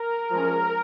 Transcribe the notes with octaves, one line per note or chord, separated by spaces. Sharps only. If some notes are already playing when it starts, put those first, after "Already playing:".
Already playing: A#4
F3 G#3 C#4